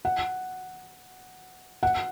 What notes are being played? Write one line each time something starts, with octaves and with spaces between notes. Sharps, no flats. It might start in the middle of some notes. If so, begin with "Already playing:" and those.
F#5
F#5